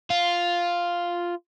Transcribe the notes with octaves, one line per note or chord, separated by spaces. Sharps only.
F4